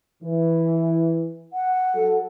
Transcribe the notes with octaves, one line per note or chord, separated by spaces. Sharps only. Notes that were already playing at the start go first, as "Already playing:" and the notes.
E3
F#5
F#3 A4